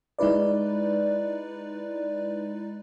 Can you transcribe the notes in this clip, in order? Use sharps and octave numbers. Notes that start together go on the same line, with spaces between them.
G#3 D#4 E4 B4 D5